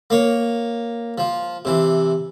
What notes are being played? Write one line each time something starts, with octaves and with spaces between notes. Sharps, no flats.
A#3 C#5
F3
C3 E3